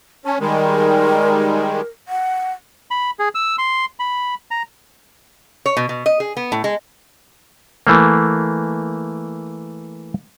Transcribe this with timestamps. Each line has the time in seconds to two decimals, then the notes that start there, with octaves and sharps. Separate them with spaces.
0.25 C#4 A5
0.40 D#3 G3 G#3 A#4
2.08 F#5
2.91 B5
3.19 G#4
3.35 E6
3.58 C6
4.00 B5
4.51 A#5
5.66 C#5
5.77 B2
5.89 B2
6.06 D#5
6.20 G#4
6.37 B3
6.52 A2
6.64 G#3
7.87 E3 A3 A#3